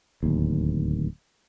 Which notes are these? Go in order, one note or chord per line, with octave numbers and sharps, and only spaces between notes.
D1 D#2